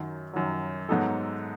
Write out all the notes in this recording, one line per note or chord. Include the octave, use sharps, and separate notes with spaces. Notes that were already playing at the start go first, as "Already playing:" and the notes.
Already playing: F#2 D#3 F#3
F#2 D#3 F#3
G#2 F#3 B3 D#4 A4